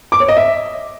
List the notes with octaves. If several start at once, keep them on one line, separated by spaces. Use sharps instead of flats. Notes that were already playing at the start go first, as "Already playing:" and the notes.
D6
C#5
D#5
E5